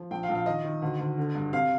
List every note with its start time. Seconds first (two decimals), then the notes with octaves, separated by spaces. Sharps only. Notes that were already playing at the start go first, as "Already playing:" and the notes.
Already playing: F3
0.11 A#1 G5
0.23 F5
0.29 A#1
0.35 F5
0.46 D#3 D#5
0.64 D#3
0.82 D2
0.99 D2
1.18 D3
1.35 G2
1.52 C3 F5